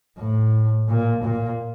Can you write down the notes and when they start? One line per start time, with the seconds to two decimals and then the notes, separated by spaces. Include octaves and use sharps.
0.18 A2
0.88 A#2
1.23 A#2